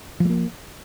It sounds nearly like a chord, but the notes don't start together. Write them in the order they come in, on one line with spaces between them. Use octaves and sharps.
F3 A3 A#3